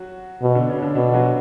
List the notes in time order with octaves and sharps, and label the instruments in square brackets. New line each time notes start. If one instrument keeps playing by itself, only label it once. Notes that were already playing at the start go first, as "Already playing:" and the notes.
Already playing: [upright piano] F#3 F#4
[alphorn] B2
[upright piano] D3 D4
C#3 C#4
D3 D4
[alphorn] B2 [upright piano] D3 D4
[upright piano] F#3 F#4